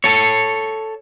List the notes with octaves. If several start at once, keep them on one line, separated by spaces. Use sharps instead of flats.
A4 C#5